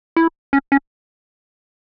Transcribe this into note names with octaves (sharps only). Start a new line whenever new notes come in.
E4
C#4
C#4